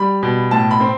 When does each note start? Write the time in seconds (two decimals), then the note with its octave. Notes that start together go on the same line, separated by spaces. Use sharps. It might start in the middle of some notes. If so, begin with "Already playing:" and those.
Already playing: G3 B5
0.23 B2
0.51 A2 A5
0.71 B5
0.80 C4